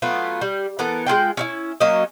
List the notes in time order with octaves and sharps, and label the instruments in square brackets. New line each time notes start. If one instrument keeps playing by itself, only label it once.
[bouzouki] F#3 A3 B3 F4
G3
E3 B3 A4 A#4
G#3 E4 F4 G5
C#4 D#4 E4
F#3 A#3 C#4 D#5